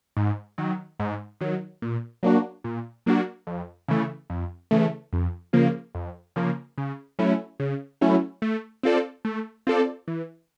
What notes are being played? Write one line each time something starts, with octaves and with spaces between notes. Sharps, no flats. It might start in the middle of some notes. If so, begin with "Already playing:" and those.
G#2
D#3 F#3
G#2
D#3 F#3
A#2
F#3 A#3 D4 F#4
A#2
F#3 A#3 D4 F#4
F2
C#3 E3 A3
F2
C#3 E3 A3
F2
C#3 F3 A#3
F2
C#3 F3 A#3
C#3
F#3 A3 C#4 E4
C#3
F#3 A3 C#4 E4
A3
C4 F4 A4 D5
A3
C4 F4 A4 D5
E3